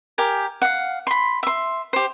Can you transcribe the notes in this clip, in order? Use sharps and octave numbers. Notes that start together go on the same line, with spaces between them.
G4 A#4 G#5
F5 F#5
B5 C6
E5 C6
G4 C5